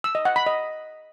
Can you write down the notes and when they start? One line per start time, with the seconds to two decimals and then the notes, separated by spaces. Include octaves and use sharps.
0.04 E6
0.15 D#5
0.25 F#5
0.36 B5
0.46 D#5